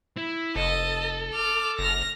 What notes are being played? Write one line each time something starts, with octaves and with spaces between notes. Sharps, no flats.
E4
F1 A4 D#5
D6 F6
F#1 F6 A#6